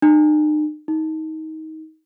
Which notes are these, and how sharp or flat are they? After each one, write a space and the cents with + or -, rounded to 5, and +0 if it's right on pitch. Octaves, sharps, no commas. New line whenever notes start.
D#4 -40
D#4 +25